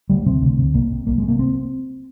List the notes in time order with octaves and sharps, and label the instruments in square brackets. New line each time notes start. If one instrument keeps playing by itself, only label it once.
[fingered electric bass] D2 G3
C3 C4
D2
C3
C2 A#3
C3
C2 A#3
C3 G#3
A#3
C4